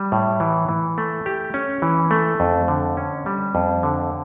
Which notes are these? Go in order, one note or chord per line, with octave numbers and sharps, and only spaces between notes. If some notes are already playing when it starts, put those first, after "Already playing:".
Already playing: G3
A2
E3
E3
A3
G4
C#4
E3
A3
F2
D3
C#4
G3
F2
D3